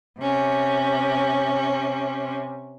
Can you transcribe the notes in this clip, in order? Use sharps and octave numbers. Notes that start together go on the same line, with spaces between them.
C3 C#4